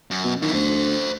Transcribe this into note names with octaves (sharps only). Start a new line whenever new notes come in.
F#2
B2
F#2 D#3 E3
D2 A4 C5